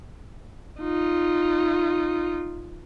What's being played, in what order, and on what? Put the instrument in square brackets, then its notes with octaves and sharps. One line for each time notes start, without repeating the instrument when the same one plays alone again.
[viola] D#4 F4